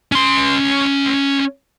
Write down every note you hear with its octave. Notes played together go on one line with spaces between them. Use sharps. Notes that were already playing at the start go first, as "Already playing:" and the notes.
C#4 C6